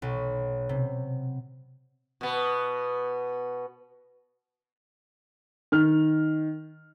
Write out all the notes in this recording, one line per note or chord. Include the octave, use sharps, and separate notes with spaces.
B1
C3
B2 B3
D#3 F6